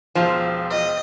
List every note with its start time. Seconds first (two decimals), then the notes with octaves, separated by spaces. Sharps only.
0.15 E1 F3 F4 C5
0.70 D#5